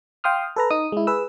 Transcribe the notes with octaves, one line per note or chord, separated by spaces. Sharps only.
F5 G5 C6 D#6 F6
A4 B4 A#5
D#4 D#6
G#3 E4
G#4 B4 E6